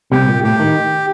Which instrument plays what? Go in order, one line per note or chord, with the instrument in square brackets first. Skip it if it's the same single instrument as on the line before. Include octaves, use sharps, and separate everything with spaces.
[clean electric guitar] C2 C3 [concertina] G4
[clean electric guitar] A#2
[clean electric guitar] A2 [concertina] G4
[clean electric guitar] D#3